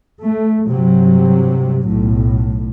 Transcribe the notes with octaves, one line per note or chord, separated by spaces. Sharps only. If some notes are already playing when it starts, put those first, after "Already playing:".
A3
G2 C3 F#3
B1 A2